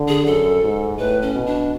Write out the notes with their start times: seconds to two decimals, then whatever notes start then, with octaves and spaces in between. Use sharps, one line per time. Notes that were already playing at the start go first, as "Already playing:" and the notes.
Already playing: D3
0.08 G#4
0.26 F#2 A4
0.63 G#2
0.98 A2 B4
1.22 C#4
1.34 B2
1.46 D4